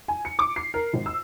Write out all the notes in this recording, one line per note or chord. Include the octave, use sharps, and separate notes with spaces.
G#5
C#7
D6
C7
A#4
G#1
E6